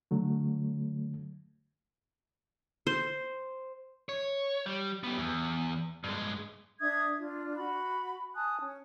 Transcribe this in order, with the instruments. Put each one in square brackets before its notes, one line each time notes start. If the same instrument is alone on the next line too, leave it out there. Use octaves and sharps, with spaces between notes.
[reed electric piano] D3 F#3 A3
[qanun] C5
[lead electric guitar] C#5
G3
B3 G4
E2
G2 G#3
[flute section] D4 E5 D#6 G#6
D4 F4
F#4 B5
G#5 A5 D#6 F#6
C#4